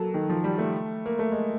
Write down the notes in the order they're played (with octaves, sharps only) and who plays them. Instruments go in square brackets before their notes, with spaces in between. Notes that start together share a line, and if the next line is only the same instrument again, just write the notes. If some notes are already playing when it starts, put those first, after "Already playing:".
Already playing: [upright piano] F#3 A#3 [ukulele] A4
[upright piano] D#3
F3
G3
A3
A#3
A3
G#3